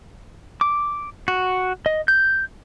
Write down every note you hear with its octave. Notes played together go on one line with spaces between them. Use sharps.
D6
F#4
D#5
G6